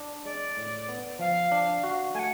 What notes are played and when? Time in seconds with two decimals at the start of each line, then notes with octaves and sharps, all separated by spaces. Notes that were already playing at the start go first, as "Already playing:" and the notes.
Already playing: D4
0.25 G#3 D5
0.57 A2
0.89 B3
1.19 F3 F5
1.52 D4
1.83 F#4
2.14 A3 F#5 G#5